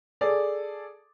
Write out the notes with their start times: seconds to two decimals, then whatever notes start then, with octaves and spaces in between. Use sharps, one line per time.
0.21 G#4 A4 D5